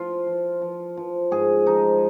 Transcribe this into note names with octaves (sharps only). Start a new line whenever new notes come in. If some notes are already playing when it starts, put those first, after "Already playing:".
Already playing: F3 F4
F3
F3
F3
G#2 G#4
F3 D#4